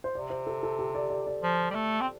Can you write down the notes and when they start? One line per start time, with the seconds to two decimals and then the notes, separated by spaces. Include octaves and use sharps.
0.04 C5
0.15 C3 D5
0.30 C5
0.47 A4
0.63 A4
0.79 G4
0.95 D5
1.10 D5
1.27 D5
1.43 F3
1.70 G3
1.75 A3
2.01 C4